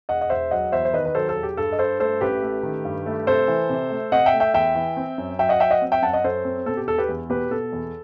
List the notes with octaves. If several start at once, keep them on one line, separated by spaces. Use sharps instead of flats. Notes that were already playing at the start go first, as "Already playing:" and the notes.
E1 D#5 F#5
D#5
E1 C5 E5
F#3 D#5 F#5
E2 C5 E5
C5
D#3 B4 D#5
B4
F#3 A4 C5
A4
E1
G4
G2 A4
D#5
G2 A4 C5
A3 A4 C5
A1 G4 B4
A3
D#3
G2
A3
C3 A4 C5
E3
C3
A3
C3 D#5 F#5
E5 G5
A3
E5 G5
E2 E5 G5
E3
C4
F#2
F#3 E5 G5
D#5 F#5
F#3 E5 G5
D#5 F#5
C4
E5 G5
F#2 F#5 A5
D#5 F#5
F#2 A4 C5
C4
B2 A4
G4
E1 A4
G4 B4
E2
B2 G4 B4
B2 A4
E2